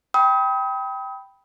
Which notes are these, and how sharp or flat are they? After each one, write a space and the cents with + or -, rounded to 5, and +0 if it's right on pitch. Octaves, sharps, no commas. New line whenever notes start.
G5 +0 B5 +0 D#6 +35